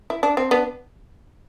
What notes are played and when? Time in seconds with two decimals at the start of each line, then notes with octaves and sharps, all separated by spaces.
0.10 E4
0.23 D4
0.37 C4
0.51 B3 D4